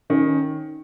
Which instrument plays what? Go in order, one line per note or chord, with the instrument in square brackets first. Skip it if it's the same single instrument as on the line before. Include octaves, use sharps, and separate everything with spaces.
[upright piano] D#3 [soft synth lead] C#4